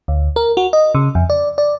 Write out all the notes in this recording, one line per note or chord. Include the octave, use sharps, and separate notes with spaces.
D2
A#4
F#4
D#5
C#3
F2
D5
D5